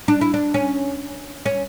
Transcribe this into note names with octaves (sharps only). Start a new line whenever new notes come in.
D4
E4
D4
C#4
C#4